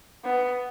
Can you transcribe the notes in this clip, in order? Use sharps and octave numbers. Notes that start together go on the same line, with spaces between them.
B3